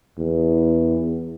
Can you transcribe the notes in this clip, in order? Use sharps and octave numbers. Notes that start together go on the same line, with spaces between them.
E2